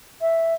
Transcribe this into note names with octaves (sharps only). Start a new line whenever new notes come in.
E5